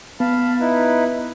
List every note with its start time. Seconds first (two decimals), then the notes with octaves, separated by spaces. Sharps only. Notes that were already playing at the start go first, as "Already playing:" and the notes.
0.20 B3 F5 A5 B5
0.60 D#4 E4 B4